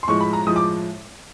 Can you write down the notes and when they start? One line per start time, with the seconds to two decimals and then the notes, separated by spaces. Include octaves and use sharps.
0.03 C6
0.07 A2 F3 G#3 C#6
0.20 B5
0.33 A#5
0.47 A2 F3 G#3 D#6
0.56 D6